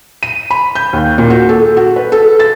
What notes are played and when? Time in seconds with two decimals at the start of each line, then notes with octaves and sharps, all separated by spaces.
0.23 D#7
0.51 B5
0.75 G6
0.93 D#2
1.18 A#2
1.30 F#4
1.49 A4
1.77 F#4
1.96 B4
2.12 A4
2.40 A6